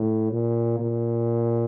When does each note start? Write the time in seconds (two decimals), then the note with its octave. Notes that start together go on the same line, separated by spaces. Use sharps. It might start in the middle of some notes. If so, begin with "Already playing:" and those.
Already playing: A2
0.32 A#2
0.79 A#2